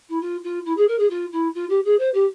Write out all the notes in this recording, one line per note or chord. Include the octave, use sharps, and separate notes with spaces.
E4
F4
F4
E4
G#4
A#4
G#4
F4
E4
F4
G4
G#4
C5
G4